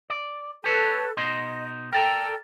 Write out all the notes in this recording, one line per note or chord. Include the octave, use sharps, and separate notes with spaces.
D5
G4 A4 B4 C#5
B2 D#4 D#5 C6
A4 A#4 D5 G5 A#5